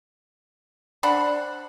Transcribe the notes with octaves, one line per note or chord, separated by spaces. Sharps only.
D4 C5 F#5 B5